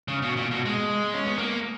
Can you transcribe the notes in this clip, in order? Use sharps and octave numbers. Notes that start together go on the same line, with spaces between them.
C#3
B2
A#2
B2
G#3
C#4
B3
A#3